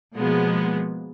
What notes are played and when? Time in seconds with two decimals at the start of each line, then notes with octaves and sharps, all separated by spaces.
0.15 B2 F3 G#3 A#3 B3